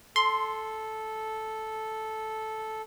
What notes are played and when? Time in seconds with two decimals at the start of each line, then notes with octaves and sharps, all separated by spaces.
0.16 A4 C6